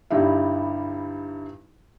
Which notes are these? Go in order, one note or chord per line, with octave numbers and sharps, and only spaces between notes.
G2 D3 G3 D#4 E4